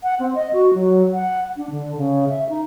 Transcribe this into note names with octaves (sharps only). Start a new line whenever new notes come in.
F#5
C4
D#5
F#4
F#3
F#5
D4
D3
C#3
E5
D#4